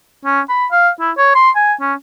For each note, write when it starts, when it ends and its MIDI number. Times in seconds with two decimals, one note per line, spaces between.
0.25 0.41 61
0.49 0.66 83
0.71 0.89 77
1.00 1.11 64
1.17 1.32 73
1.35 1.50 84
1.55 1.73 80
1.81 1.93 61